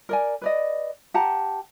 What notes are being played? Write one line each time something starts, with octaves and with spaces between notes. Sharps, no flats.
A#4 D5 G#5
B4 D5 D#5
G4 F#5 A5 A#5